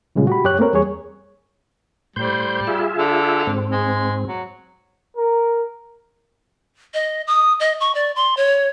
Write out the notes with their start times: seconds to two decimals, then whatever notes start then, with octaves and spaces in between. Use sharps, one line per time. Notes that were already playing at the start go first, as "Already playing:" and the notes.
0.15 A#2 C#3 G3 G#3 C#4 F4
0.27 F#4 G4 B5
0.44 F#2 G4 C#5 F#6
0.59 A3 A#3 C4 A#4 C#5
0.73 E2 G3 G#4 C#5
2.16 A2 G3 C5 G6
2.67 F4 G#4 E5
2.98 D3
3.47 G#2 C4
3.72 G#3
4.28 F#3
5.17 A#4
6.94 D#5
7.27 D#6
7.60 D#5
7.80 C#6
7.95 D5
8.16 C6
8.37 C#5